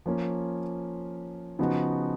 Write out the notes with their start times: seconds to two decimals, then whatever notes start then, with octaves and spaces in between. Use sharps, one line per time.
0.06 F3 A#3 C#4 F4
1.59 C#3 F3 B3 D#4 F#4